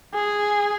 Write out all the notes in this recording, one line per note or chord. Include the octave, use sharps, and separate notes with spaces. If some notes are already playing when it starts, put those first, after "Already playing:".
G#4